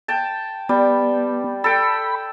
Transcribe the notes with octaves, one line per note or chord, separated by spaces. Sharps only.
G5 A5
G3 B3
A4 G5 B5